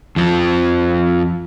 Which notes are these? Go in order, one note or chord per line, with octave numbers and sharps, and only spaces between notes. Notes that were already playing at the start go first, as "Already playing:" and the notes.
F2 F3